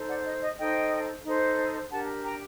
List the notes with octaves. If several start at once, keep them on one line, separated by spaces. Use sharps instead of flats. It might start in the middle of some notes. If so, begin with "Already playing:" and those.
Already playing: D#4 A4 C5
D5 F#5
D#5
D#5
D#4 A4 C5 D#5 G5
D#4 A4 C5
D4 G4 A#4 F#5 A5
G5 A#5